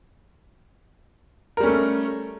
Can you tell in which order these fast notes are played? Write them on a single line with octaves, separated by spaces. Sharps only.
A#4 G3 C#4 A3